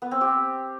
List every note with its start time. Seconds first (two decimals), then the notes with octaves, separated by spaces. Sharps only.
0.02 B3
0.11 C4
0.21 G4